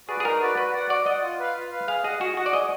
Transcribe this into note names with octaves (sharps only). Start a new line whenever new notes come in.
F#4 G#4 B4 D5
G#4
D#4 A#4
F#4 B4 D5
F#4 B4
D5 F#5
F#4 D5
D5 D#5 F#5
F4
B4 F5
F4
B4 F5
G#4 F5
G#4 D#5 F#5
F#4 G#4
F#4 D#5 F#5
D5
G#4 D#5